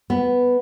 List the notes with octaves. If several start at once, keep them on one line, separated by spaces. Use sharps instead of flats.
B3